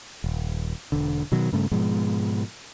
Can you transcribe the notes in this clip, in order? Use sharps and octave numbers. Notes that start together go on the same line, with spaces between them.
D#1
E1 D3
B2 D#3 F#3
G2 C#3 A3
G#2 B2 F3 G#3